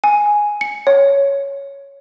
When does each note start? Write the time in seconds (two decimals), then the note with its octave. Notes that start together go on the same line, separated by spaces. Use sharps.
0.04 G#5
0.61 C#7
0.87 C#5